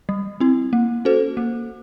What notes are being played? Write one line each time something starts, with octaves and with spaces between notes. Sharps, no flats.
G3
C4 E4
A#3
C#4 F#4 A4 C5
A#3